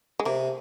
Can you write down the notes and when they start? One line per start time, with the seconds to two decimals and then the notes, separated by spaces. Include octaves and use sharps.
0.20 G#3
0.26 C3 A#3